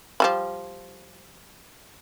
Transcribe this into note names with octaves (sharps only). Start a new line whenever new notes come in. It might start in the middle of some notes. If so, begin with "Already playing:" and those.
F3 G3 B5